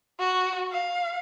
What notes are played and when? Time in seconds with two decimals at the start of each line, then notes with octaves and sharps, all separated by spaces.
0.19 F#4
0.72 F5